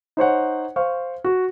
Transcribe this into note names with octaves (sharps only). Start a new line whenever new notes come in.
D#4 C5 C#5 F#5
C5 F5 C#6
F#4